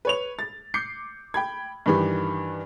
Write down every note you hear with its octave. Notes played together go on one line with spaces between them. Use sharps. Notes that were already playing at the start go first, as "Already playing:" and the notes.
B4 C#5 F7
A6
D6 G6 C7 C#7
G5 B5 G#6
G2 D#3 E3 G3